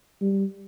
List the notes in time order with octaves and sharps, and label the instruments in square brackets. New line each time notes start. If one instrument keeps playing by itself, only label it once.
[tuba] G3